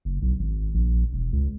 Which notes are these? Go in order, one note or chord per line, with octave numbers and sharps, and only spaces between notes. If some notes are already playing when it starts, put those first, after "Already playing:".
F#1
B1
G#1
A#1
E1
C#2